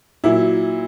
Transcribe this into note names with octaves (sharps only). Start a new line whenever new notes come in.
A#2 F#3 E4